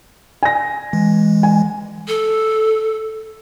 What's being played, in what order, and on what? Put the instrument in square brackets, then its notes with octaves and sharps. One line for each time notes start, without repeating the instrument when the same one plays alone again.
[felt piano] G#5 A#6
[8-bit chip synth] E3 G#3
[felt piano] G#5
[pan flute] A4